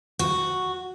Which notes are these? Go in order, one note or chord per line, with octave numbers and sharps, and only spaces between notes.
F#4